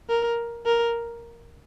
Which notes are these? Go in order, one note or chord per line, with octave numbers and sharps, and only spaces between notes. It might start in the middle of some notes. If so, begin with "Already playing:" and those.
A#4
A#4